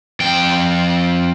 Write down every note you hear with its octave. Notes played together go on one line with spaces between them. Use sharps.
F2 G5